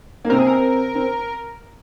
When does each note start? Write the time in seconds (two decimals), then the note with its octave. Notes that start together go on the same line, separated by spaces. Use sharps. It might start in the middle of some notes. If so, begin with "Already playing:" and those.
0.25 A#3
0.30 C3 C4 A#4
0.39 G#4
0.47 A#4
0.95 C4